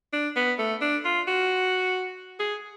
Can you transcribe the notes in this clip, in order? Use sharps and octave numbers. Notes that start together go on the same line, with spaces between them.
D4
B3
A3
D4
F4
F#4
G#4